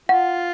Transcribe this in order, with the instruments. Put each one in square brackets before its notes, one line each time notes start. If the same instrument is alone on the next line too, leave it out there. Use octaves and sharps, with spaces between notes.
[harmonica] F4 [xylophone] F#5